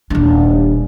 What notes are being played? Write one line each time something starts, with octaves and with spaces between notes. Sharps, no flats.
D#1 D4